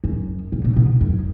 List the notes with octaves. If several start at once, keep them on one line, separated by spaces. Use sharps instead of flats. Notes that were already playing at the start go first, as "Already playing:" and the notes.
F#2
A#2
B2
B2
F#2